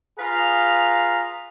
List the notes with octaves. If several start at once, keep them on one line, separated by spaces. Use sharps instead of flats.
F4 G#4 B4 F5 A#5